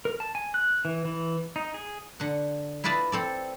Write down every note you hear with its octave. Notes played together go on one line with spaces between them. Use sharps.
A#4
A5
G#5
F#6
E3
E3
D#4
G#4
D3 F#5
E4 F4 B4 D5 D#5 A5
C4 A4 D5